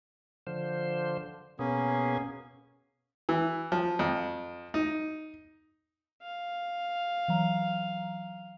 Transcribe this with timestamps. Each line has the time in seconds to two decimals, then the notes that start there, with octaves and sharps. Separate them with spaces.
0.47 D3 F3 C5
1.59 B2 A#3 B3 C#4 G#4
3.29 E3
3.72 F3
3.99 F2
4.74 D#4
6.22 F5
7.28 E3 F#3 A#5